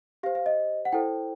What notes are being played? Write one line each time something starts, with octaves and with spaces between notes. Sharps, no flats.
G4 C5 F5
F5
D#5
F#5
E4 A4 C5 G5